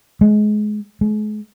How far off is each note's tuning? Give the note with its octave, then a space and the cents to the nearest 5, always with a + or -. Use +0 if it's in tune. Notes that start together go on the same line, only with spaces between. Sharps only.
G#3 +25
G#3 +40